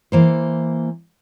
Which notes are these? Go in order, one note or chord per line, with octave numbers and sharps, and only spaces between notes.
E3 A#3 C5